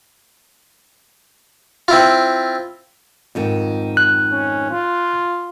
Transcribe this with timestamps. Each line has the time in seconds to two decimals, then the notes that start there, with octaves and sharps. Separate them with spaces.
1.88 C4 E4 F4
3.35 F2 G#2 D#3
3.97 F#6
4.32 C#4
4.71 F4